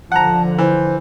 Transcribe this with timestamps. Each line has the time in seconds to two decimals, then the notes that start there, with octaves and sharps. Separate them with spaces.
0.12 D3 F3 F#5 A5 A#5
0.58 E3 C5